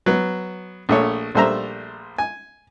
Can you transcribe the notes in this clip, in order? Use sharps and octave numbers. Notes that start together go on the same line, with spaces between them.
F#3 B3
A#1 A3 C#5
A#1 G3 A3 C5 E5 A#5
G#5